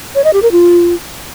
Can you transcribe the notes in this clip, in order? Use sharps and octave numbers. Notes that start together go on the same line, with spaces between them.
C#5
D#5
G4
A#4
F4